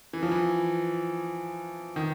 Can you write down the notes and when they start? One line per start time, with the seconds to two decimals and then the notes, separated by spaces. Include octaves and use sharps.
0.13 E3
0.23 F3
0.31 E3
1.96 D#3